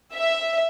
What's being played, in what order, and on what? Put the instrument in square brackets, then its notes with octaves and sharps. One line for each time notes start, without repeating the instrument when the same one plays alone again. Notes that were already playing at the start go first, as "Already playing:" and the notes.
[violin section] E5